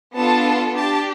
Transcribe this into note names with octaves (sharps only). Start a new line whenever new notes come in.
B3 D4 F4 A4 A5
D4 G4 A5